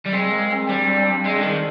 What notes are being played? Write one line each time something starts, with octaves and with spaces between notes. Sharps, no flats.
G3
G#3 C4
A#3
C4
G3 D4
C4
C4
C4
G#3
D3
D#3